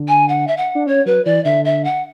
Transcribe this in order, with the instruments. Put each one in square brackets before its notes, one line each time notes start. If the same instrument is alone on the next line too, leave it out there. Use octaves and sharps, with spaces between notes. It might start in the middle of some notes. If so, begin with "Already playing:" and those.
Already playing: [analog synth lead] D3
[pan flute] G#5
F#5
E5
F#5
[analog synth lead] D4
[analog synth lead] C#4 [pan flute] C#5
[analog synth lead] F#3 [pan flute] B4
[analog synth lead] E3 [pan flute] D5
[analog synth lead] D3 [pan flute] E5
[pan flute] E5
F#5